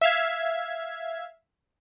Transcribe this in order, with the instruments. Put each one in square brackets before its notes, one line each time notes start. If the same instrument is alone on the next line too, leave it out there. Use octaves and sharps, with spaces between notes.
[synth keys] E5 F5 G#6